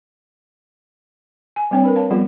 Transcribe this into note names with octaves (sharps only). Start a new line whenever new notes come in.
G#5
G3 A#3 C4 D4 C#5 D5
A#4 B4 B5
C#5 F5 A5
F3 G3 B3 F4 G#4 D5